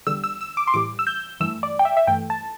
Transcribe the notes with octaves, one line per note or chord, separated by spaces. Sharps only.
E2 D3 G3 E6
E6
E6
D6
C6
A2 E3 G3 D6
E6
G6
G2 E3 A3 E6
D5
G5
E5
E5
G2 E3 A3 G5
A5